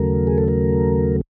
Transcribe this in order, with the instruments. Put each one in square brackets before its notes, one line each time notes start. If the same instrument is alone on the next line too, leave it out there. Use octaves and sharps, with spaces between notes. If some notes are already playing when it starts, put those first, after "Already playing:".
Already playing: [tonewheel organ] D#2 C#3 F#3 A3 A#4
G#4
A4
A#4